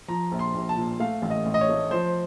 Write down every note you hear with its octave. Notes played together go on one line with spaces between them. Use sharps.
F3 A#5
A#1
C6
A#1
A5
A#2
A3 F5
A1
D#5
A1
D#5
C#5
A3
F3 C5